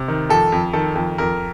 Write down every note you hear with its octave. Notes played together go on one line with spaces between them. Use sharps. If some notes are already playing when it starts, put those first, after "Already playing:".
Already playing: C3
D#3
F2 A4
F2
D#3 A4
F2
F2 A#4